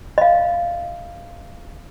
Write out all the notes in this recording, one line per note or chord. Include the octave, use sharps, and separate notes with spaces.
D#5 F5